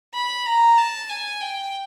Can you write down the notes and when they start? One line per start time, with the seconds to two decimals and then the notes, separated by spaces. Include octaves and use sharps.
0.14 B5
0.46 A#5
0.78 A5
1.09 G#5
1.41 G5